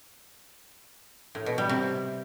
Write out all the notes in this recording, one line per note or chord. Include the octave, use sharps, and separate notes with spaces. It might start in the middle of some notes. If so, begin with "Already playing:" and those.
A2
B2
G3
C3